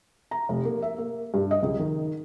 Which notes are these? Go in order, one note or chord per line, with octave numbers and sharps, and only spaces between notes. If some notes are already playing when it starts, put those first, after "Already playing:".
A#5
F1
A#3
E5
A#3
G2
D#5
C#2
D#3